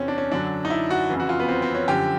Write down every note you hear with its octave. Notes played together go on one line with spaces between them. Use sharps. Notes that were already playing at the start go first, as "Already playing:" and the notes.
Already playing: E2 C3 E3 C4 C#4
D4
C#4
F#2 D3 F#3 D4
D#4
E4
F#4
F2 C#3 E3
F#4
F4
B3
C4
C4
C#4
F#2 D3 F3 G4